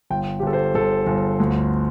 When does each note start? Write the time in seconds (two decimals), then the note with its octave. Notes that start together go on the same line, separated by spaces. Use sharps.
0.10 G1 G5
0.39 G4
0.42 G1 A4
0.53 C5
0.75 G1 A4
1.07 G1
1.40 D2